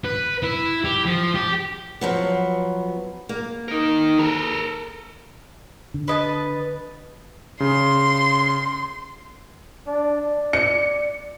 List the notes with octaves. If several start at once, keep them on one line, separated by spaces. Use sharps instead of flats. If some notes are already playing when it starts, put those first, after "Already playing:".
B4
E4
G4
F3
G4
F3 F#3 B3
A#3
D#4 A#4
A4 A#4
D3
B4 D#5 A5
C#3 C6
D4
D5
C#7